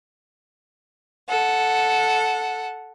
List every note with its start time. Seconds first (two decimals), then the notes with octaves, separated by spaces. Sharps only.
1.29 A4 F#5